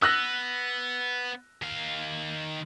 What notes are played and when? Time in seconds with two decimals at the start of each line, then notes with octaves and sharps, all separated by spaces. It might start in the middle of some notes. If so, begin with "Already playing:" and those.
0.02 B3 E6 F#6 A#6
1.62 D#3 F5